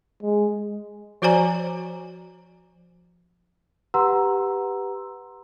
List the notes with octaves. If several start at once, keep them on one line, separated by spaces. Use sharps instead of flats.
G#3
F3 F#4 C5 D5 G#5 A#5
G4 B4 F#5 A#5 C6 E6